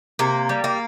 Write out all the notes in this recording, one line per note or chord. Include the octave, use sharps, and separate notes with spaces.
C3 A#3
G3
A#3